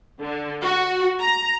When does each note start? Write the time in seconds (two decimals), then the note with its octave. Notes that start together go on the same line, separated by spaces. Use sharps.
0.20 D3
0.63 F#4
1.20 A#5